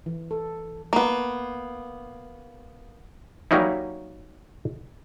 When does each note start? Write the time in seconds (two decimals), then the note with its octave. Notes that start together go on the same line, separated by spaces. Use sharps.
0.06 E3
0.31 A4
0.93 A#3 B3
3.51 F#3 G3 A#3 C#4 D#4 E4